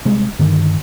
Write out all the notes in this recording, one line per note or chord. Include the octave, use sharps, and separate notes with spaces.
C3 G3 G#3
G2 D3 D#3